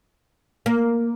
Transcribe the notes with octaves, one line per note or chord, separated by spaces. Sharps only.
A#3